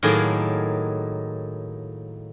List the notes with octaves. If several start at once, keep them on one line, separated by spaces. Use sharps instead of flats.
A2 D#3 F#3 A#3 G#4